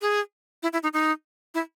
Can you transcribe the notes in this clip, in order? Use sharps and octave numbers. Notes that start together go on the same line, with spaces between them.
G#4
E4
E4
D#4
D#4
E4